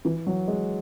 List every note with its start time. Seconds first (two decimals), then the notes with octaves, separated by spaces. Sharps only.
0.05 E3
0.27 F#3
0.48 G#3